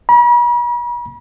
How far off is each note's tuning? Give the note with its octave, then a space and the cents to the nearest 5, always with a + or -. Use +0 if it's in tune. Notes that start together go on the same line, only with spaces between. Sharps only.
B5 -45